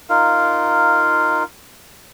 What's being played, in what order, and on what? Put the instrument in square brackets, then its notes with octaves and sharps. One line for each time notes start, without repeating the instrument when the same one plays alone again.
[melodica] D#4 F4 A#4 F5